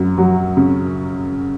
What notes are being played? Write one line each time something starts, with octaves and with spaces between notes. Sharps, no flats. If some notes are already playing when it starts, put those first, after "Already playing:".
Already playing: F#2
F#3
C#3